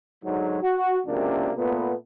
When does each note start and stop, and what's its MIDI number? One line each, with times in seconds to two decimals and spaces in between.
0.24 0.58 44
0.24 0.58 50
0.24 0.58 54
0.62 0.99 66
1.07 1.50 37
1.07 1.50 42
1.07 1.50 48
1.07 1.50 58
1.07 1.50 62
1.56 1.94 46
1.56 1.94 57
1.56 1.94 59